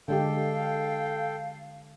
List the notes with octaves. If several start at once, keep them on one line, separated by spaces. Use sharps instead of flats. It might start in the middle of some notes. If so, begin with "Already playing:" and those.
D3 G#3 G4 A4 F5 G5